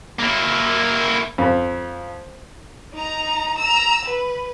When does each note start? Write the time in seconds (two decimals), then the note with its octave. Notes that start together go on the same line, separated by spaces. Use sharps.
0.19 A#3 E4
1.38 F2
2.93 D#4 A#5
3.58 A#5 E6
4.05 B4